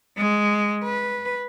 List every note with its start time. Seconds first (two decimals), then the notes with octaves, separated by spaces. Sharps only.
0.18 G#3
0.84 B4